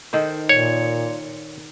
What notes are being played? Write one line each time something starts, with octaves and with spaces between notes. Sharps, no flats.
D#3 A4 C5
A#2 C#5